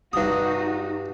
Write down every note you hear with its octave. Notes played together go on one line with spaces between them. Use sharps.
G2 D#4 F#4 D#6